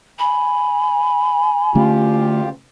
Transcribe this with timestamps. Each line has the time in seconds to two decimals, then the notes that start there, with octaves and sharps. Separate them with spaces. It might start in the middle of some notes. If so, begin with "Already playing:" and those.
0.19 G#5 B5
1.75 D3 A3 C#4 F4 G4